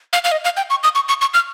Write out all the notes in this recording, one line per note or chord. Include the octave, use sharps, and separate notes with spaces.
F5
F5
D#5
F5
G5
C#6
D#6
C#6
C#6
C#6
F6